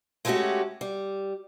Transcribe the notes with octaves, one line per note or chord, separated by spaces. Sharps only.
G#3 A3 C#4 D4 F#4 G4
G3